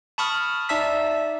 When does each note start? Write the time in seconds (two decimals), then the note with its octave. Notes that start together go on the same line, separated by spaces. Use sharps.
0.18 A5 B5 C#6 D#6 F6
0.69 D#4 D5 E5 A5 E6 B6